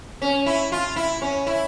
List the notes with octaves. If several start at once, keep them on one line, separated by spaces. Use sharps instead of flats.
C#4
E4
F4
E4
C#4
E4